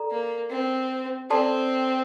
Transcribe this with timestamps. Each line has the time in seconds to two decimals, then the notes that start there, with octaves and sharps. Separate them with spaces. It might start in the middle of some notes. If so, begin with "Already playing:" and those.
Already playing: A4 D5 A#5
0.11 A#3
0.50 C4
1.30 C4 A4 D5 A5 C6